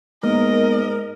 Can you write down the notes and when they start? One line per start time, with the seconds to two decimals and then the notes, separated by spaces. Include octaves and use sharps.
0.23 G#2 G#3 A#3 B3 A#4 D#5